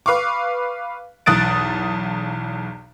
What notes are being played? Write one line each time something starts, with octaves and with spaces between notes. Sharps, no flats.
B4 F5 C#6 D6
B1 E2 D#6 F#6 A6 D7